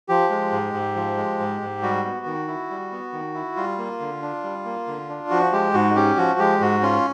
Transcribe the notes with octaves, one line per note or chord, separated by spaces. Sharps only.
F3 G4
G#3
G#2
G#2
F3
G#3
G#2
G#2
G3 F#4
B3
D#3
E4
G3
B3
D#3
E4
G3 F4
A#3
D3
D4
G3
A#3
D3
D4
F3 F#4
G#3 G4
G#2 F#4
C#4 G4
F3 F#4
G#3 G4
G#2 F#4
C#4 F4